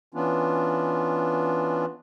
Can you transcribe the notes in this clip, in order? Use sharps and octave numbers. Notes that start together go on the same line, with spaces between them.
E3 B3 C#4 D4 F4